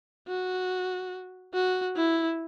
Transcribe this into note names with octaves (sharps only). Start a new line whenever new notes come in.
F#4
F#4
E4